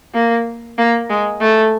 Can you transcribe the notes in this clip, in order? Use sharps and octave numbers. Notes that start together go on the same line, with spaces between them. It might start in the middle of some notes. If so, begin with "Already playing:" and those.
A#3
A#3
G#3
A3